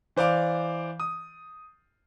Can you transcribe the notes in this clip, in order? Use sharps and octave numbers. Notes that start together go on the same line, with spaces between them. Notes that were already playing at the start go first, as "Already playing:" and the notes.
E3 C5 D5 F5 D6
D#6